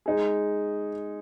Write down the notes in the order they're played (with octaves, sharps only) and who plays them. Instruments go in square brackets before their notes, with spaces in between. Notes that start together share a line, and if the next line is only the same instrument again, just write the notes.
[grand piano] G#3 D#4 G#4